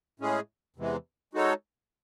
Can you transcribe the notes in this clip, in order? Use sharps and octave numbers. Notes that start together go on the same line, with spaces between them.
A2 G#3 C#4 G#4
E2 C3 E3 G#3
G#3 D#4 F#4 A4 C#5